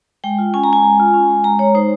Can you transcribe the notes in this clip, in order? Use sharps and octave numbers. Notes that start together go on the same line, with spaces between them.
G#3 G5
F4
C#4 G#5
A#5
G#3 G#5
G#3
F4
C#4
G#3
G#3 A#5
G#3 C#5
D#4 C5